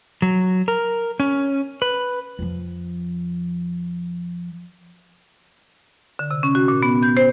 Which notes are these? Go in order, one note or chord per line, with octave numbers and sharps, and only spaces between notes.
F#3
A#4
C#4
B4
F2 F3
D3
C3
C#4
F#4
A#2
B3
G6
C5